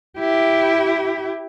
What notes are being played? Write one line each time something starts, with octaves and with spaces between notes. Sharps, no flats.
E4 G4